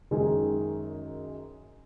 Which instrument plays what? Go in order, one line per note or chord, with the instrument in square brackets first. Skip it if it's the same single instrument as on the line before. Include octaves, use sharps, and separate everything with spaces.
[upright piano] F#2 D#3 G#3 D#4 G#4